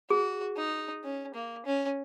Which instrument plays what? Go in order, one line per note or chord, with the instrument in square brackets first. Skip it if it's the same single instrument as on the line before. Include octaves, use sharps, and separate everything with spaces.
[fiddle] F#4 [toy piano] G#4
[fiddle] D#4
C#4
A#3
C#4